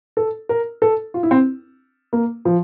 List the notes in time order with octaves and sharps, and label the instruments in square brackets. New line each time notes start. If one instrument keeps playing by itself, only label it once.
[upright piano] A4
A#4
A4
F4
E4
C4
A#3
F3